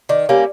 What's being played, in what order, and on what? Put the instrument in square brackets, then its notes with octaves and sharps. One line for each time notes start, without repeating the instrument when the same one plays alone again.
[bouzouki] D#3 [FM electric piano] D5
[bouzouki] G3 A#3 C#4